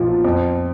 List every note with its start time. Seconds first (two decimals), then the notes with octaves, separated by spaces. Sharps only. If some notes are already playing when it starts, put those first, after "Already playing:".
Already playing: B1 A#2 F3
0.25 F2